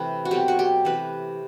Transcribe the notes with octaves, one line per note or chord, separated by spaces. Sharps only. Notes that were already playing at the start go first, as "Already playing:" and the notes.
Already playing: C3 E3 A3 B4
F#4
B2 F#3 A3 C4 G4
F#4
G4
C3 E3 A3 B4